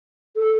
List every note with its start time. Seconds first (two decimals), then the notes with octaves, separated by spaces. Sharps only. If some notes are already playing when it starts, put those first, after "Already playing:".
0.36 A4